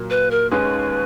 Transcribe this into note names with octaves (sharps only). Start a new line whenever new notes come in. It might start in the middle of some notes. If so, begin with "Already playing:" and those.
Already playing: A#2 F#3 A#3
B4
A#4
D#2 D#3 G#3 C#4 G#4 B4